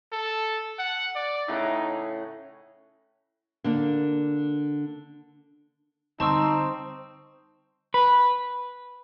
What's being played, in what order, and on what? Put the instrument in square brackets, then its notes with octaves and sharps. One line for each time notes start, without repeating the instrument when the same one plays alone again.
[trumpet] A4
F#5
D5
[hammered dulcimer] A2 C#3 F#5 [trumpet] D#4
[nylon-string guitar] D3 A#3 D4
[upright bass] D3 G3 [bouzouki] C4 [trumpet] D#4 [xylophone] A5 C#6 E6
[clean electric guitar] B4